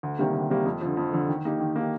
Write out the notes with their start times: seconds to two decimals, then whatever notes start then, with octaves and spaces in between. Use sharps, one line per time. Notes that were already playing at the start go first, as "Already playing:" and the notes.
0.03 D2
0.19 C3 D#3 G3 A#3
0.34 D2
0.50 C3 D#3 G3 A#3
0.65 F2
0.81 D3 F3
0.97 F2
1.13 D3 F3
1.29 D#3
1.45 A#3 D#4 G4
1.60 D#3
1.76 A#3 D#4 G4